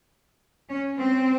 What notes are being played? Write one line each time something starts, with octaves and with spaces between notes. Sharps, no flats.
C#4
C4